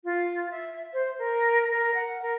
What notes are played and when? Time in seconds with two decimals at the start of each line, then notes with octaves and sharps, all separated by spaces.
0.04 F4
0.50 E5
0.93 C5
1.18 A#4
1.71 A#4
1.94 F#5
2.22 A#4